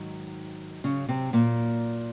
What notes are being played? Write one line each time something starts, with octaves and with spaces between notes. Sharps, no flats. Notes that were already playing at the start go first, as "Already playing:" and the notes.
Already playing: G#2 D#3 F#3
C#3 C#4
C3 C4
A#2 A#3